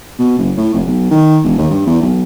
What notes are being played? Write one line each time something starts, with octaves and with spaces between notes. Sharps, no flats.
B2
F#1
A2
F1
B1
D#3
E1
D#2
G2
E2
B1